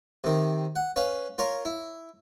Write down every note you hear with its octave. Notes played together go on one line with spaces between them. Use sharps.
C3 D#3
F#5
C#4 B4 F5
F4 A#4 C#5
E4